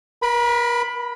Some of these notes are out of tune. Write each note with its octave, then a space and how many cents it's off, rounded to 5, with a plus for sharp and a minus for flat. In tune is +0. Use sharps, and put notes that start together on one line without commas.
A#4 +40 B5 +0